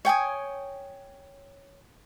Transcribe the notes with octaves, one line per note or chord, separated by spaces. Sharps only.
C#5 G5 G#5 D#6